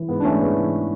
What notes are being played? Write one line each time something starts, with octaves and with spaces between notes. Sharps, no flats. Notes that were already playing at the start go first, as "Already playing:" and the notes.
Already playing: E3
G#2 B3
D4
E3 A3 C#4
G#2 B3
E3